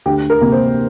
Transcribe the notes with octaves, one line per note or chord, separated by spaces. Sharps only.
D2 G4
A#4
C3 A#3
C5